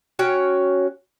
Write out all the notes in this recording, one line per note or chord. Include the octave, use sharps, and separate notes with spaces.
C#4 F#4 C#5 G5